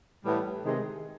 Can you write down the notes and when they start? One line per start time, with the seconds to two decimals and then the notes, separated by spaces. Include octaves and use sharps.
0.24 A2 E3 G3 B3
0.63 C3 D#3 G#3